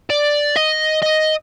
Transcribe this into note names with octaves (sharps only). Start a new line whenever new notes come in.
D5
D#5
D#5